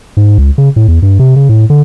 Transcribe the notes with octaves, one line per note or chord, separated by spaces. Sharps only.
G#2
C#2
C#3
A2
E2
G2
C3
C#3
A2
D3